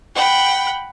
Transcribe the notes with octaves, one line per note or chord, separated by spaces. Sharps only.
F#5 G5 B5